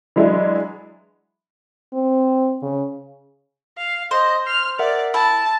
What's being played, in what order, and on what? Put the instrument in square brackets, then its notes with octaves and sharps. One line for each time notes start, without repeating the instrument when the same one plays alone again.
[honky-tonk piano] E3 F#3 G#3 D4 E4
[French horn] C4
C#3
[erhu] F5
[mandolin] C5 [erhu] D#5
[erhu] F6 [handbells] C7
[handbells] A#4 E5 F#5 [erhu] D5
[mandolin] E4 [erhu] A5 [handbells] E6